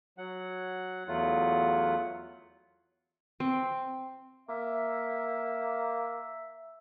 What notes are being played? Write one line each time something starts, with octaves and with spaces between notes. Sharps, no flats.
F#3 F#5
E2 F#3 A3 F4 F#5
C4
A#3 E5